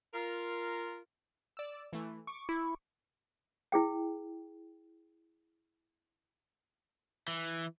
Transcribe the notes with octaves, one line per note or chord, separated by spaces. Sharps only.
F4 A#4
D5 E6
E3 A3
C#6 D6
E4
E4 G#4 G5
E3